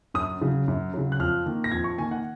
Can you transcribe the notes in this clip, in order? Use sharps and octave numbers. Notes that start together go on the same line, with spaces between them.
F#2 D#6
C#3 F#3
F#2
C#3 F#3
F#6
F2 F6
D#3 A#3
A#6
F2 G#6
C#6
D#3 A#3 G#5
F#5